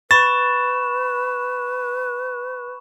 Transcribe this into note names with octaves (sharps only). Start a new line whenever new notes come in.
B4 B5 C#6 A6 E7